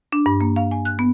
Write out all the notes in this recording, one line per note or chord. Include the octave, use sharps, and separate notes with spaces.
D4
G2
A#3
F5
G#5
F#6
B3